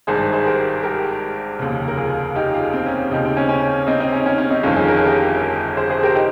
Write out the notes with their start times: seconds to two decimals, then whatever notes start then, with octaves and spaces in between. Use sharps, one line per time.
0.07 G#1 G2 D#3 G#4 C5
0.32 G#4 C5
0.45 G4 A#4
0.83 G4 A#4
1.59 F1 D#2 C#3
1.88 A#4
1.97 F4 G#4
2.36 D#4 G4
2.54 F4 G#4
2.73 C4
2.86 C#4
3.11 D#2 C#3 D#4 G4
3.25 C4
3.37 C#4
3.49 C#4
3.87 C4 D#4
4.00 C4 D#4
4.12 C#4
4.26 C#4
4.38 C#4
4.51 C4 D#4
4.63 G1 F2 D#3 C#4 F4
4.76 F4 G#4
4.88 A#4
4.98 G#4
5.06 G4 A#4
5.77 G#4 C5
5.89 G#4 C5
6.03 G4 A#4
6.15 D#4 G4